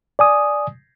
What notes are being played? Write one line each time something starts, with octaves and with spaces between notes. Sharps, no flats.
D5 G#5 D#6